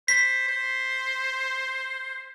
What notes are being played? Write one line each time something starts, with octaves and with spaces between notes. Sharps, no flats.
C5 B6
C5